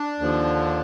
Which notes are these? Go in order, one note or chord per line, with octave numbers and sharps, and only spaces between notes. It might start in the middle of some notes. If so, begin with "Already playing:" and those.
Already playing: D4
D#2 D3 F3